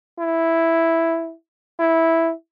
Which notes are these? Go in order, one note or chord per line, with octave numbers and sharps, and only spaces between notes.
E4
E4